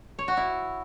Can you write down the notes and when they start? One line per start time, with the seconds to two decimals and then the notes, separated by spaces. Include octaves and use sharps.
0.19 C#5
0.28 F#4
0.37 E4